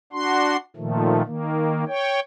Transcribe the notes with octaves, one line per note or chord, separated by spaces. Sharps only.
D4 F#4 C6
A#2 D#3 F3 A3
D#3 A#3
C#5 G5